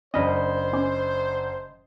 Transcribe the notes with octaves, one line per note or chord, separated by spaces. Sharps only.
F#1 C#4 D4 C5 D#5 B5 F6
C#4 D6